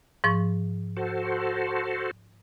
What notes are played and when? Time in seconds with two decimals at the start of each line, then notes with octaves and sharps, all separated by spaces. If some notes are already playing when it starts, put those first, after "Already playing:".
0.24 G#2 F3 C#6
0.97 F#4 A4 C5